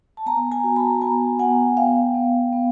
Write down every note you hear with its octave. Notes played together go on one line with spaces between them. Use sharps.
A5
B3 G#5 A#5
G#5 A#5
F#4
A5 B5
B3 G#5 A#5
B3 F#5 G#5
B3 F5 G5
B3
B3